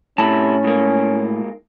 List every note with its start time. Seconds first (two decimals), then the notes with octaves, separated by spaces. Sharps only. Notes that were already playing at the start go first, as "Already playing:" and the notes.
0.18 A2 C3 C#4 E4 A5
0.64 G#2 A#3